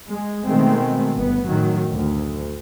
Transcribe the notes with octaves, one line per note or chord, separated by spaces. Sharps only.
G#3
B2 D#3 G#3 A3 C4
G1 B3
F#2 A2 D#3 F#3
D2